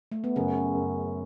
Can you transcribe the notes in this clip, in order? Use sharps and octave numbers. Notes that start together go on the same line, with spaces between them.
A3
B3
F#2 C#3 C#4
F#2